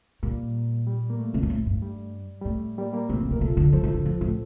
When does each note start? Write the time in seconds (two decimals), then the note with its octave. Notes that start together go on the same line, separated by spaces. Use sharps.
0.23 A#2 G3 A#3
0.87 G3
1.10 A#3
1.19 A3
1.34 C3
1.43 A#2
1.50 A2
1.66 G2
1.82 G3
2.41 G3
2.45 A2 A3
2.78 G3 A#3
2.93 G3 A#3
3.09 A#2 A3 C4
3.20 C3
3.31 C3 A#4
3.41 C3 F4 A4
3.57 D3
3.73 F3 A4 C5
3.83 D#3
3.94 D3
4.05 F3
4.21 A2